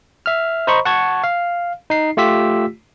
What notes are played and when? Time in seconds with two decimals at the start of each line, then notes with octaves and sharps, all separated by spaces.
0.26 E5 F6
0.67 C5 D#5 A#5 B5 C#6
0.85 F#5 A5 C#6 G#6
1.24 F5
1.90 D#4 C7
2.17 A3 F4 G4 E6 B6